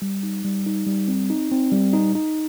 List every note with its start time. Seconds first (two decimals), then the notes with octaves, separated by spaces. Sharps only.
0.02 G3
0.23 D#4
0.45 G3
0.66 D#4
0.87 G3
1.08 C4
1.30 D#4
1.52 C4
1.72 G3
1.93 D#4
2.15 D#4